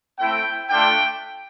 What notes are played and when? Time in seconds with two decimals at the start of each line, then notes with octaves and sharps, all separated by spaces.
0.19 A3 C4 E4 G5
0.70 A3 D4 F4 G5